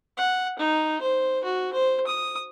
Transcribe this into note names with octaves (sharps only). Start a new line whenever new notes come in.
F#5
D#4
C5
F#4
C5
D#6